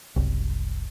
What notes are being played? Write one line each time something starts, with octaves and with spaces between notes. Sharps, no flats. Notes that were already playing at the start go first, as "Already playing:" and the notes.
F#1 C2